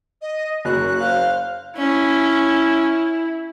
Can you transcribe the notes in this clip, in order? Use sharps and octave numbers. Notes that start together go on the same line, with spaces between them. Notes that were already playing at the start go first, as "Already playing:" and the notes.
D#5
F#1 F#4 F#6
C5 F5
C#4 E4